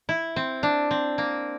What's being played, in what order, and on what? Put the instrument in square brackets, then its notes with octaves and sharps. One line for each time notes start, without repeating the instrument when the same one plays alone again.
[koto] E4
C4
D4
C4
A#3